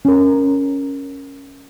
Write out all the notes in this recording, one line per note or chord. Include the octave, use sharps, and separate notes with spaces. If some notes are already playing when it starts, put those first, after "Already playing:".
C#4 A#4